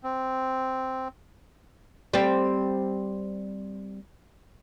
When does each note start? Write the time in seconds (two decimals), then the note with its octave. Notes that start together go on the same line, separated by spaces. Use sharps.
0.04 C4
2.14 G3 C4